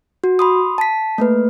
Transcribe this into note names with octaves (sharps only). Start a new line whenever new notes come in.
F#4
B5 C6 D#6
A5 B6
A3 A#3 B4